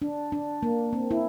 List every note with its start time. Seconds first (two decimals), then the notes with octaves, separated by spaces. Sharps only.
0.02 D4
0.32 D4
0.63 A#3
0.93 C4
1.11 E4